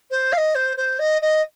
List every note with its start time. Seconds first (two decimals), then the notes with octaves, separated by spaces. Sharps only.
0.11 C5
0.32 F5
0.37 D#5
0.55 C5
0.77 C5
0.99 D#5
1.22 D#5